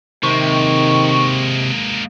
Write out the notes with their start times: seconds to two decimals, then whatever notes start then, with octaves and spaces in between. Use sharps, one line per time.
0.23 C3 D#3 G#3 A#3 C#6